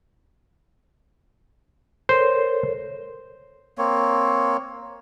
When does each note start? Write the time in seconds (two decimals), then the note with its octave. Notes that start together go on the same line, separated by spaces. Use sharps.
2.09 A4 A#4 C5 C#5
3.78 A#3 C4 C#5